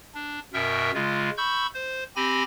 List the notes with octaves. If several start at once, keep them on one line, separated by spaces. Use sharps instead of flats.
D4
F#2 B2 A#4 E5 G5
C#3 G#3 F4
B5 C#6 E6 G6
C5
C4 G4 G#5 B5 A#6